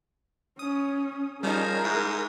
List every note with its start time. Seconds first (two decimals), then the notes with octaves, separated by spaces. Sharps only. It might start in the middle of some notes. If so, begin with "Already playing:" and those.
0.59 C#4 D#6
1.43 F3 G3 C#4 D#4 G#4 A#4
1.84 G#2 E4